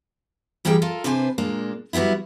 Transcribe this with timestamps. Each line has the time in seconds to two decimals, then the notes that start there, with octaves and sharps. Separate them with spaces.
0.65 E3 G3 A#3 G#4 G5
0.82 F4 A4 A#4
1.04 C3 D4 B4 C5 G#5
1.38 A#2 G#3 A#3 D4
1.93 F#3 G3 B3 C4 E4